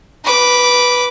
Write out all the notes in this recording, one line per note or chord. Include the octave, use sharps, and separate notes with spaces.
B4 D6